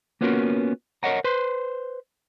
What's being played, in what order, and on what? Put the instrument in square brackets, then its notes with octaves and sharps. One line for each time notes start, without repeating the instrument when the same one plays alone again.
[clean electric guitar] A#3 B3 C#4 F4 F#4 A#4
A#4 C#5 D#5 F#5 A#5
B4 C5 C6